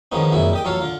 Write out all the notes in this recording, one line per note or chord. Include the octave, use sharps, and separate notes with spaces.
D3 D#3 F3 G#3 B3 C#4
C2 F#2 A#2 G#3 E4
G4 D#5 G5
A1 F#3 F4 A4 C#5 F5
D3 F4